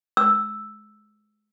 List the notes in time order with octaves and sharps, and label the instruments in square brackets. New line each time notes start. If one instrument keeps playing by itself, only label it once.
[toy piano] E6